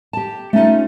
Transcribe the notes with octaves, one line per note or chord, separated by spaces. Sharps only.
G4 A5
A3 C#4 D#4 F4